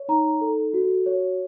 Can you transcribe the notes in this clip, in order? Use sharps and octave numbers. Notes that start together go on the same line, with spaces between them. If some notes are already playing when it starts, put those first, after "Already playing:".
Already playing: C#5
D#4 A#5
A4
F#4
C#5